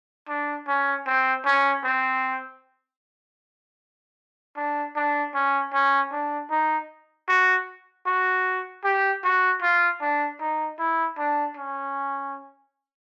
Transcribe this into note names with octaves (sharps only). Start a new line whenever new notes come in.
D4
C#4
C4
C#4
C4
D4
D4
C#4
C#4
D4
D#4
F#4
F#4
G4
F#4
F4
D4
D#4
E4
D4
C#4